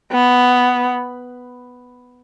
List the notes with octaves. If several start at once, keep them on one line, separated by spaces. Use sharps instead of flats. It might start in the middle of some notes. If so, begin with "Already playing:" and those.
B3